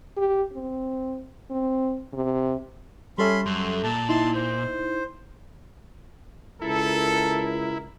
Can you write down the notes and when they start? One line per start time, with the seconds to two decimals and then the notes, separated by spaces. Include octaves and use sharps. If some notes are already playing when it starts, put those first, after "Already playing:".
0.17 G4
0.53 C4
1.51 C4
2.13 C3
3.18 G3 C#4 A4 E5 B5 C6
3.46 F#2 C6
3.84 A#2 A5
4.09 D#4 E4 A5 C6
4.35 C5
6.62 C#2 E4 A4 A#4